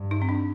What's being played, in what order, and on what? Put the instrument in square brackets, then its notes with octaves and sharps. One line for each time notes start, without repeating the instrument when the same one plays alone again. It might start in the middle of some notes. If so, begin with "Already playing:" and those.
Already playing: [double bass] G2
[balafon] D#4
C4
D4